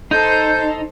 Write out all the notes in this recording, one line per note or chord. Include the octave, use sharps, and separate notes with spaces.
D#4 A4 C5 G6